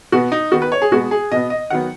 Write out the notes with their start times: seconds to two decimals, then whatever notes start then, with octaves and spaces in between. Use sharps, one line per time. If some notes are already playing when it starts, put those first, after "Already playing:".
0.12 B2 B3 F#4
0.32 D#4
0.52 D#3 B3 F#4
0.62 B4
0.72 C#5
0.82 G#4
0.91 B2 G#3 B3 F#4
1.11 G#4
1.32 B2 B3 D#5
1.50 D#5
1.70 D#3 F#3 B3 F#5